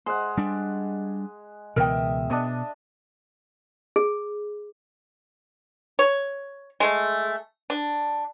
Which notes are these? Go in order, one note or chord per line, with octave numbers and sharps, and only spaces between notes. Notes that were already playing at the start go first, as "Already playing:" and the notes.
G#3 C5 F#5
G3 D4
C#2 B2 E3 A#4 E5 G5 D#6
B2 B3 D4 D#5 D#6
G#4
C#5
G#3 A3
D4